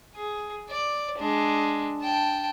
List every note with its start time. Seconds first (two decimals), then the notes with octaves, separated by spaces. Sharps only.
0.15 G#4
0.70 D5
1.18 G#3 D4
2.02 G5 A5